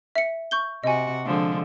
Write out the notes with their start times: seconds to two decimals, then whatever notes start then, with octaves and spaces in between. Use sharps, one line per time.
0.16 E5 C#7
0.51 C#6 G6 G7
0.84 C3 F#4 D#5 G#5
1.25 D3 F3 G#3